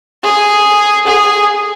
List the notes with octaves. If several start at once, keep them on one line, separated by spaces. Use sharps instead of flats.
G#4
G#4